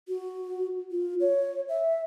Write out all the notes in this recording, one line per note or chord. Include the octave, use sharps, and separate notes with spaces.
F#4
F4
C#5
E5